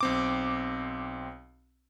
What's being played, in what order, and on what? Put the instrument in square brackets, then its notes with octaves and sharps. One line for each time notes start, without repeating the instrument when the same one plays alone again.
[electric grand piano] B1 C4 D6